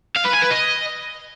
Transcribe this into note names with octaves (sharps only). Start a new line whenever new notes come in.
F5
B4
G#5
B4
D#5